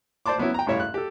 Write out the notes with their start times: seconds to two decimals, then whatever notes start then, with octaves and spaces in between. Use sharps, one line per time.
0.26 C5 D5 A5 C6 D6
0.38 F#3 B3 C#4 E4
0.54 G5 A#5
0.66 A1 G2 E4 C#5 E5 F5
0.80 F#6
0.94 G4 A4